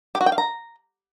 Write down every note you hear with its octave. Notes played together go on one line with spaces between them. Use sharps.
G4
F#4
G5
F5
A#5